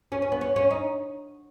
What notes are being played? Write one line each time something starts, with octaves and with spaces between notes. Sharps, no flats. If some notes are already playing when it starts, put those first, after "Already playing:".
C#4
C#4
B3
C#4
C#4
D#4